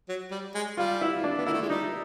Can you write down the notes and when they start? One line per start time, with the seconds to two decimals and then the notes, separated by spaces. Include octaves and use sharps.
0.09 F#3
0.31 G3
0.55 G#3
0.77 G3 F4
1.01 E4
1.24 D4
1.38 B3
1.46 A#3 E4
1.54 A3
1.62 G#3
1.70 G3 D#4